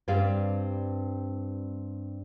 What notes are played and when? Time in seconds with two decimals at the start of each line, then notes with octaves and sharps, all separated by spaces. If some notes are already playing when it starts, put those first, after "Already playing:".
0.08 G2 G3 C4 D5 F5